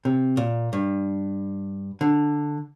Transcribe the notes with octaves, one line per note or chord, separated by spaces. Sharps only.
C3
A#2
G2
D3